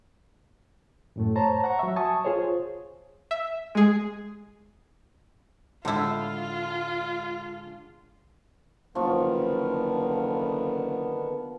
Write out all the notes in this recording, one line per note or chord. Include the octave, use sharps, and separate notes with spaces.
F#2 A2 A3
C5 C#5 A5 A#5
F#5 A#5 C#6
F#3 E5
G#5 A5 C#6 D#6
F4 G#4 C5 C#5
E5
G#3 G#4
A2 D3 G#3 D4 E4 F4 F#5
F#1 D3 D#3 F3 B3 C#6